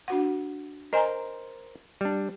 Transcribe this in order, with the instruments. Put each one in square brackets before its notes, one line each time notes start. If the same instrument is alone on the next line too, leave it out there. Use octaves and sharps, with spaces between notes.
[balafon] D4 F#4 F#5
[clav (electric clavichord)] A#4 C5 [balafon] D#5 G#5 A#5
[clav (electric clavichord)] G3 D4